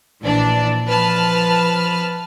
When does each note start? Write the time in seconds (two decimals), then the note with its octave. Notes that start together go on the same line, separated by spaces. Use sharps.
0.21 A#1 E3 D4 D5
0.86 F3 B4 A5 F6